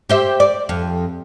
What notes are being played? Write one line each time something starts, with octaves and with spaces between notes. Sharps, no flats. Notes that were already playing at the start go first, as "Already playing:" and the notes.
G4 C5 E5
D5
F2